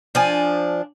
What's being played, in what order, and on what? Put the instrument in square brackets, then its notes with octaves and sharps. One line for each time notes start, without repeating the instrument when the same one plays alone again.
[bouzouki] F3 D4 G#5